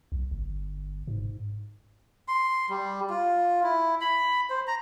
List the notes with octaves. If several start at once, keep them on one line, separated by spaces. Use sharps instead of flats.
B1
G1
G#2
C6
G3
F4
E4
B5
C5
A#5